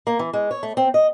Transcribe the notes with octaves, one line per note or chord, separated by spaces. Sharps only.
A#3
E3
G#3
C#5
A3
C4
D#5